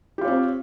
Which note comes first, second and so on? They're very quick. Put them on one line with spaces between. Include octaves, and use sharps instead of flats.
G4 F4 C#5 C4